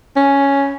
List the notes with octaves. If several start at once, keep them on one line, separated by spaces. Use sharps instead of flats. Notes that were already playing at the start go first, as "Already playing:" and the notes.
C#4